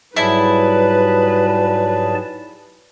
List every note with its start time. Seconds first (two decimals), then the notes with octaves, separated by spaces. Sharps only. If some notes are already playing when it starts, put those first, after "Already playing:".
0.17 G#2 F#3 G3 E4 G#4 B4 D5 A5